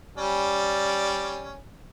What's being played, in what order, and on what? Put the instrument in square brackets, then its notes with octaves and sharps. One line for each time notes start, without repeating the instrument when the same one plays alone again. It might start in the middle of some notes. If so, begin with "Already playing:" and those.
[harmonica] G3 C#4 D5